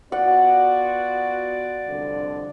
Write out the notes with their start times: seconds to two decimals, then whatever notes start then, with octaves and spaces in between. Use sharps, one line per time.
0.12 B3 F4 F#4 D5 F#5
1.88 C2 F2 D3